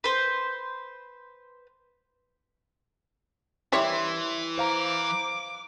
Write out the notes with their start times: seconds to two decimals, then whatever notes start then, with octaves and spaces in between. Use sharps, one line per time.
0.04 B4 C5
3.72 E3 G3 E4 C#5 E5 C6 B6
4.58 C5 F5 A#5 D6